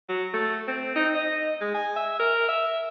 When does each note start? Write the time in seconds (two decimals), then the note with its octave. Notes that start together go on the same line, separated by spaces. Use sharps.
0.09 F#3
0.34 A3
0.68 C4
0.96 D#4
1.15 D#5
1.61 G#3
1.74 G#5
1.96 E5
2.19 A#4
2.49 E5